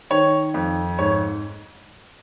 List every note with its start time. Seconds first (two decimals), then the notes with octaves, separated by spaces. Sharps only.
0.10 D#3 C#5
0.54 F2
0.98 G#2 C#5